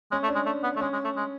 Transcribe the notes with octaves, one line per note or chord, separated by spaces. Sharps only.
G#3 C#4
A3
D4
G#3
A3
B3
A3
G#3 C#4
G#3
A3
G#3